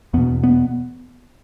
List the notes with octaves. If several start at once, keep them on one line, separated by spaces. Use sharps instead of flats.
E2 B2 B3
B3